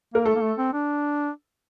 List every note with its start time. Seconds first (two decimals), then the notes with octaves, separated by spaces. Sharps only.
0.14 A#3 A#4
0.26 A3 A4
0.36 A#3
0.42 A3
0.58 C4
0.73 D4